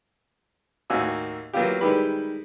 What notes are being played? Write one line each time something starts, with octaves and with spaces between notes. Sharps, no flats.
D#2 A2 A#3 F#4 G#5 E6
F#3 A#3 B3 E4 F4 G4
D#3 G3 G#3 E4 G4 B4